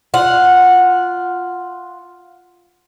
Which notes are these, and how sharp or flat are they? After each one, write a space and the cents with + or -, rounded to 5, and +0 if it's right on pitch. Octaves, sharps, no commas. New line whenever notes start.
F4 +0 F#5 -10